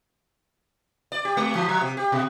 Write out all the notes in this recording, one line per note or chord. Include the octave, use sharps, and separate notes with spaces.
D5
G4
G#3
E3
F3
C3
G4
B2